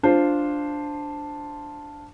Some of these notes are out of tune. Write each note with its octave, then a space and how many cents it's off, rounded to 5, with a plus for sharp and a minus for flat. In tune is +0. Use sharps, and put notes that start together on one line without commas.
D4 +0 F4 +0 C5 +0